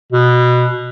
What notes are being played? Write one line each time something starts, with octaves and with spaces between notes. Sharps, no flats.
B2